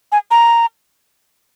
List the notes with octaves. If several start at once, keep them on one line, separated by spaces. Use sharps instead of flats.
G#5
A#5